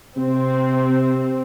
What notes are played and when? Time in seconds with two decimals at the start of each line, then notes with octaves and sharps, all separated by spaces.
0.17 C3 C4